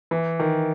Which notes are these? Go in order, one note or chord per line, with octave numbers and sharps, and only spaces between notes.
E3
D#3